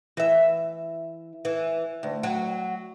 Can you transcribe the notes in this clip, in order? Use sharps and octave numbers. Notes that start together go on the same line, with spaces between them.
E3 E5
E3
D2
F#3